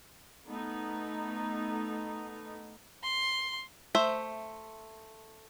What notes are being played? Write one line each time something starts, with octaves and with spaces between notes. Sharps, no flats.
A3 B3 D#4
C6
A3 C5 E5